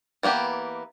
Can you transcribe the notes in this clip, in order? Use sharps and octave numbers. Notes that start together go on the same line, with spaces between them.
E3 A#3 B3 G4